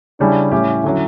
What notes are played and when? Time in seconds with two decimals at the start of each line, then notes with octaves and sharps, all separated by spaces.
0.20 C#3 G3 C#4 D4 E4
0.52 A2 G3 C#4 E4 G4
0.84 D3 F#3 C#4